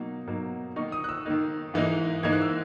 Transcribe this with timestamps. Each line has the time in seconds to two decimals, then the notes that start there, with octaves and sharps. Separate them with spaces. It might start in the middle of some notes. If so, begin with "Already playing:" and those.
Already playing: B2 F#3 A#3 D#4
0.27 B2 F#3 A#3 D#4
0.76 D#3 A#3 D#4 C#6
0.92 D#6
1.04 F#6
1.09 E6
1.26 D#3 A#3 D#4
1.74 G#2 E3 A#3 D#4
2.23 G#2 E3 A#3 D#4 G#6
2.33 F#6
2.42 E6